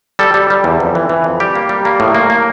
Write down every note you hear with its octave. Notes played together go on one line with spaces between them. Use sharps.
G3 A4
G3
G3
E2
F2
E3
E3
F2
G3 G4
A#3
G3
A#3
A2
A#3
A#3